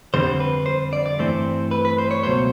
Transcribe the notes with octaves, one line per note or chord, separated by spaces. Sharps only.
F2 D3 G3 C4 C5
B4
C5
D5
D5
G2 E3 A3 C4 C5
B4
B4
C5
C#5
C#2 B2 F#3 A3 C5